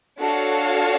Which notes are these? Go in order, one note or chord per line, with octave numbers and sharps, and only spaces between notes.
D4 F#4 A4 C#5 F5